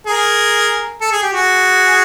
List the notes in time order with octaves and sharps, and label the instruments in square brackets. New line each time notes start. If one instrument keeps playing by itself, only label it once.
[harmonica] G#4 A#4
A4
G#4
G4
F#4 G#4